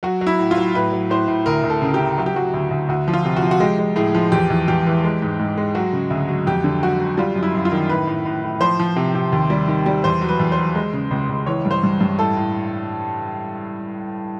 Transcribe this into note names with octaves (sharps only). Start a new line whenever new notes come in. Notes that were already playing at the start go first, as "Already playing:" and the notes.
F#3 F#4
F#3
E4
A2
F4
F#3
A2 B4
F#3
A2 C5
A2
D2 A#4
D2
A4
C#3
G4
C#3
F#3 F#4
G4
F#3 F#4
D2
D2
D2 F#4
F3
F4
C3
F#4
F3
F#4
G#3 G4
G#3
A2 G#4
F3
E2 G4
E2
E2 G4
E3
G#3
G#2
G#2
G#3
F#3 F#4
C#3
D2
F#3
F2 G4
D3
F#3 F#4
F#3
G3 F4
F#2
E4
F#2
F4
D#3
A2 B4
A2
A2
A2
F3 C5
F3
C3
C3
D#2
G3
D#3
G3
E2 C5
F#3
B4
E2
C5
F#3
G#3
C#3
C#2
C#2
E3 C#5
G2
C5
G2
G2
A2 A4
A2